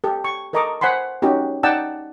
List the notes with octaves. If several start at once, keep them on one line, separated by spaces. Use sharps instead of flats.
G4 A4
C#6
A4 A#4 D#5 A#5 C#6 D6
C5 F#5 G#5 B5 C6
C#4 D#4 F#4 G4
D#4 D5 F#5 G5 A5 E6